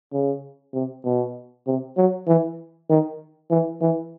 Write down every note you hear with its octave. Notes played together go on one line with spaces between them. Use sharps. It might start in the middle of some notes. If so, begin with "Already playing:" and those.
C#3
C3
B2
C3
F#3
E3
D#3
E3
E3